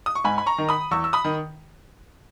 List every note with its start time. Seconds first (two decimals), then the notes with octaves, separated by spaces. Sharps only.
0.06 D#6
0.15 C#6
0.24 G#2 G#5 B5
0.38 B5
0.46 A#5 C#6
0.58 D#3
0.69 B5 D#6
0.91 E2 C#6 E6
1.04 E6
1.13 B5 D#6
1.24 D#3